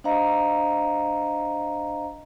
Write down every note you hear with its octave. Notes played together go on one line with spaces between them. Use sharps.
D4 C5 D#5 F5 A#5